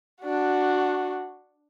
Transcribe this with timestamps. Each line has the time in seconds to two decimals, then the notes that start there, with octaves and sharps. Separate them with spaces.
0.21 D4 F#4